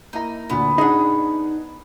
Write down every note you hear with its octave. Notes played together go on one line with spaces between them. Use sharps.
A#3 D#4 E4 A#5
D2 A#2 D3 B3
D4 D#4 G#4 F#5